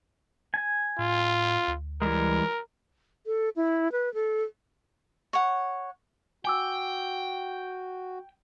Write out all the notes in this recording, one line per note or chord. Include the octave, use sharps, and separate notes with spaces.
G#5
A2 F4
D2
E3 G3 G#3 A#4
A4
E4
B4
A4
C#5 F#5
F#4 G5 G#5 D6 E6